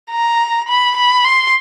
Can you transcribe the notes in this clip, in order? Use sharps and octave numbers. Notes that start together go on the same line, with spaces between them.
A#5
B5
B5
C6